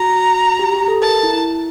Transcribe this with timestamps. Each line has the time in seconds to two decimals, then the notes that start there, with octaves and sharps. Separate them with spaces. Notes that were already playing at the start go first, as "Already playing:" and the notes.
Already playing: F#4 A#5
0.59 G4
0.73 G4
0.88 A4
1.02 A#4 A5
1.23 E4